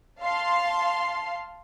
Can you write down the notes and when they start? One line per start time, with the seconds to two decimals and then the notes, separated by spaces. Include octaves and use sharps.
0.19 F5 A5 C6